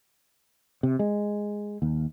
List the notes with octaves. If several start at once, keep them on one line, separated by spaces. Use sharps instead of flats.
C3
G#3
D#2